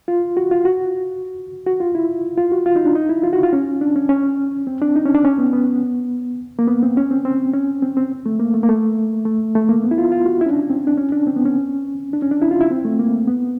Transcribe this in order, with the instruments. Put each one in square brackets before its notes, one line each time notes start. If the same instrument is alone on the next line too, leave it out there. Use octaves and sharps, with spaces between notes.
[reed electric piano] F4
F#4
F4
F#4
F#4
F4
E4
F4
F#4
F4
D#4
D4
D#4
E4
F4
F#4
F4
C#4
D4
C#4
C#4
C4
D4
D#4
C#4
D4
C#4
B3
B3
A#3
B3
C4
C#4
C4
C4
C#4
C4
C4
A3
A#3
A3
A#3
A3
A3
A3
A#3
B3
E4
F4
F4
F#4
E4
C#4
D4
C4
D4
C#4
D4
C4
B3
C#4
D4
C#4
D4
E4
F4
E4
C4
A3
A#3
B3